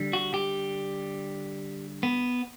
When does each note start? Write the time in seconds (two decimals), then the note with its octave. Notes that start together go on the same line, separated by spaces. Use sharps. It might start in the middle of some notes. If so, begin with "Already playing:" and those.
Already playing: D3 G3
0.13 F#4
0.34 G4
2.03 B3